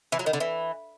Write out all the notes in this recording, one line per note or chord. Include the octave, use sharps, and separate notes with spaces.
E3
F#3
D#3
D3
E3